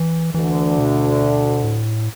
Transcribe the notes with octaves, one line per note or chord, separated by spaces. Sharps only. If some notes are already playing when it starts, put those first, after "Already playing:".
Already playing: E3
D2 D3 E3
B2
A2